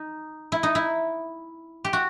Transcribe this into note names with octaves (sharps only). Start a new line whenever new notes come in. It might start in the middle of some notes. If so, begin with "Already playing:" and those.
Already playing: D#4
E4
D#4
E4
G4
F#4